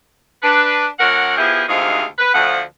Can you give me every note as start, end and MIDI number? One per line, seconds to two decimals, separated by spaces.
0.43 0.87 62
0.43 0.87 71
1.00 1.33 38
1.00 1.33 54
1.00 1.33 70
1.00 1.33 78
1.37 1.64 53
1.37 1.64 59
1.37 1.64 64
1.37 1.64 67
1.37 1.64 68
1.69 2.04 38
1.69 2.04 44
1.69 2.04 48
1.69 2.04 51
1.69 2.04 68
1.69 2.04 77
2.18 2.30 71
2.34 2.60 38
2.34 2.60 53
2.34 2.60 78